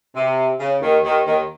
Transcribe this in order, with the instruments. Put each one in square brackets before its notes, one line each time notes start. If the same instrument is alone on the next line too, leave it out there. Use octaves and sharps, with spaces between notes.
[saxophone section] C3
C#3
D#2 D#3
D#2 D#3
D#2 D#3